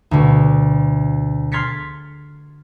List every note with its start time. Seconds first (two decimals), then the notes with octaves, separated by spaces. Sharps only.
0.11 D2 B2 F#4
1.52 C6 F6 G#6 A6 B6 C#7